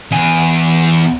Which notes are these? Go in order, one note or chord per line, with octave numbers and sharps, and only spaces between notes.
E2 G#5